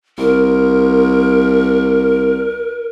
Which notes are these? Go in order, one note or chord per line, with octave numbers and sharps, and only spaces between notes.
C2 A#4